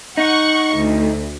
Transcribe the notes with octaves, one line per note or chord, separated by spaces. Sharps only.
D#4 F#5 C#6
D2